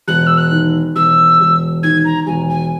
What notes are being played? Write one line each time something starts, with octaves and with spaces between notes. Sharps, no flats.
E1 F#6
E6
F#6
D#3
E1 E6
E1
D#3 G#6
A#5
E1 G#5
G#5